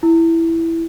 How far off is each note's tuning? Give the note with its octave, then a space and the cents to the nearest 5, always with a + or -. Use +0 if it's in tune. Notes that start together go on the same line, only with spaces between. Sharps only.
E4 +5